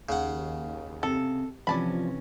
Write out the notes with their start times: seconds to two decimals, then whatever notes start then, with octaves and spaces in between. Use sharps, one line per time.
0.09 D#2 C#3 F#5
1.03 C3 A4
1.67 C3 E3 F3 C#4 D5 A5 B5